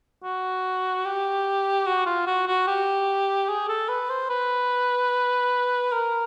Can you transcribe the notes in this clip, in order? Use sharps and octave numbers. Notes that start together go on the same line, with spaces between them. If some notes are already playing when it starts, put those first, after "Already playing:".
F#4
G4
F#4
F4
F#4
F#4
G4
G#4
A4
B4
C5
B4
A#4